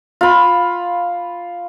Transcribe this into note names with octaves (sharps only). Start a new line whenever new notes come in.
F4 B5